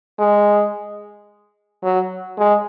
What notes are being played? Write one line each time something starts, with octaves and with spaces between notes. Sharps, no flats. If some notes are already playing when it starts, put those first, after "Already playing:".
G#3
F#3
G#3